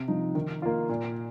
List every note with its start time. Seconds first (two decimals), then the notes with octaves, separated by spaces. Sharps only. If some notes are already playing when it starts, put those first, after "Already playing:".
Already playing: C3
0.08 F3 D#4
0.35 D#3
0.62 A#3 F4
0.89 A#2